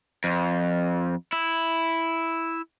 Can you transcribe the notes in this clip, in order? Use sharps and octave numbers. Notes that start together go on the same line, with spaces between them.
F2
E4